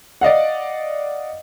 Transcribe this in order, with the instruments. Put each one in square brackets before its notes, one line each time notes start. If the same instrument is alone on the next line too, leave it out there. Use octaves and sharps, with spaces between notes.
[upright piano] D5 D#5 F5 F#5